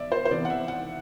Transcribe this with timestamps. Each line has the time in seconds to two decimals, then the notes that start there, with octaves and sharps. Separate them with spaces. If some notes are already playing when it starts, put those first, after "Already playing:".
Already playing: B2 D5 E5
0.12 C5
0.25 C5
0.31 C3 E3 B3 D5
0.45 F#5
0.50 E5
0.68 F#5